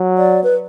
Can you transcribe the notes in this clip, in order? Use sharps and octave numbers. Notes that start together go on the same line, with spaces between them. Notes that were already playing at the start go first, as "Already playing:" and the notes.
Already playing: F#3
D5
B4